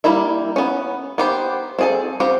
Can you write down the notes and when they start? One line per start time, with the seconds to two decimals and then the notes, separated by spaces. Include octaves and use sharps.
0.04 G3 A#3 E4 E5
0.56 B3 C#4
1.18 B3 G4 C5
1.79 C4 G#4 A4
2.20 C4 F4 G4 F#5